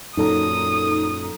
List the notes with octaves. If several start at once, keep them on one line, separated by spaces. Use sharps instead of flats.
F#2 A#2 F#3 D#4 A4 A#5 D#6